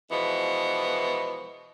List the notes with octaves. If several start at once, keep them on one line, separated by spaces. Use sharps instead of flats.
B2 E3 F3 G#3 B3